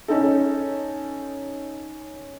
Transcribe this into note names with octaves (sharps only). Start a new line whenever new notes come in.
C#4 D#4 A4